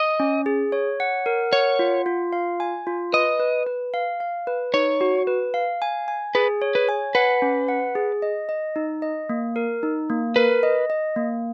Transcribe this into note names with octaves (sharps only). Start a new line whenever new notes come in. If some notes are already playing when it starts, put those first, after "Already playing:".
Already playing: D#5
C#4
G#4
C#5
F#5
A#4
C#5 F#5
F4
F4
F5
G#5
F4
B4 D#5
B4
B4
F5
F5
B4
D#4 C#5
F#4
B4
F5
G#5
G#5
G#4 B4
C#5
B4
G#5
B4 F#5
C#4
F#5
G#4
D#5
D#5
D#4
D#5
A#3
A#4
D#4
A#3
A#4 B4
D#5
D#5
A#3